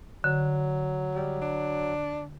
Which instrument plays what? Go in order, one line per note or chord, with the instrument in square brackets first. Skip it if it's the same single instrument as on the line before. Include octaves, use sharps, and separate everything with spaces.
[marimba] D3 [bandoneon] F#3
[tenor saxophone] G3
D4